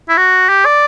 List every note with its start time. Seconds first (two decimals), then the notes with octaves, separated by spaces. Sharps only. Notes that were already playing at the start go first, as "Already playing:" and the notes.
0.09 E4
0.17 F#4
0.49 G4
0.65 D5